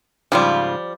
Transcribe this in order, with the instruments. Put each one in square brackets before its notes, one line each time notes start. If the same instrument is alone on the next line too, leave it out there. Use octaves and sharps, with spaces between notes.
[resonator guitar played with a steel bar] G#2 C#3 F4 [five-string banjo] F3 G3